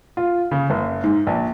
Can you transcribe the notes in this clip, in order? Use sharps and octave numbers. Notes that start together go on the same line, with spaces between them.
F4
C#3
F#1
G#2
A#1